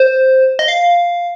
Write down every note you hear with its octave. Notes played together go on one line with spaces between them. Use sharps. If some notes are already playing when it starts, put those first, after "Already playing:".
Already playing: C5
D#5
F5